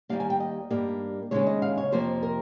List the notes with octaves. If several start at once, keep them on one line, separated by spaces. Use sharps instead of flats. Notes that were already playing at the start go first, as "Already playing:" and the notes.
D#2 D#3 G3 A#3 F5
G#5
G5
D#5
G2 G3 A#3
D#2 C#3 F3 G#3 C#5
D#5
F5
C#5
F2 C3 F3 A#3 C5
A#4